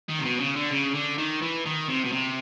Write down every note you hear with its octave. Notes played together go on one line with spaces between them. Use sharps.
D#3
C3
B2
C#3
D3
C#3
D3
D#3
E3
D#3
C3
B2
C3